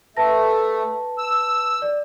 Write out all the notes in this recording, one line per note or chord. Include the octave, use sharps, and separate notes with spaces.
A3 B4 A5 A#6
E6
D5